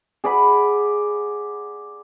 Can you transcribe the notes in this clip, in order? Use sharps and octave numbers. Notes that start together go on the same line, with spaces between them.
G#4 D5 F#5 B5